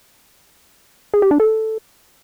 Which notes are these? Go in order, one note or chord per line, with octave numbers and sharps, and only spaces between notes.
G#4
G4
D4
A4